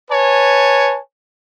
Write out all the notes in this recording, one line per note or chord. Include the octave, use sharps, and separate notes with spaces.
B4 C#5 G#5 A5